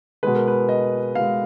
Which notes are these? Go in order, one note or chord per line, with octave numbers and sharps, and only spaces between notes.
B2 G#3 B4
A#4
B4
D#5
B2 G#3 F5